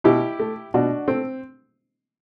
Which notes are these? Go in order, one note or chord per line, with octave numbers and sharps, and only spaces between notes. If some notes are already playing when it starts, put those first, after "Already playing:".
B2 E4 G4
A3
B2 D4 F#4
A3 C4